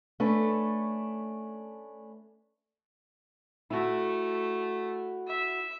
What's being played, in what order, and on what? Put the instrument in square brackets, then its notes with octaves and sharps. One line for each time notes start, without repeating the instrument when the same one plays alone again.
[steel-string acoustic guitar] A3 C#4 D4 B4
[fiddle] A3 [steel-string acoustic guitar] E4 F#4
[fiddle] E5